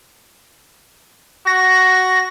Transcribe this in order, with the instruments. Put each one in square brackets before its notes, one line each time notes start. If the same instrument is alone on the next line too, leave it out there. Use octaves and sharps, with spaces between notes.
[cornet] F#4 [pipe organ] A#6